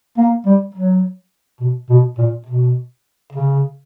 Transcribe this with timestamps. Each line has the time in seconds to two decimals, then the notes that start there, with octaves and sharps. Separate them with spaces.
0.18 A#3
0.46 G3
0.75 F#3
1.61 B2
1.90 B2
2.18 A#2
2.46 B2
3.33 C#3